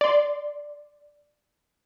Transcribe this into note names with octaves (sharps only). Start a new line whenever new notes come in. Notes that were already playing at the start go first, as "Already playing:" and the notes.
D5 C6